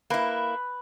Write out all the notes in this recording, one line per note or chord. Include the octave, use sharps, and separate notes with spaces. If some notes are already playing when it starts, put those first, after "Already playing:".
A#3 E4 B4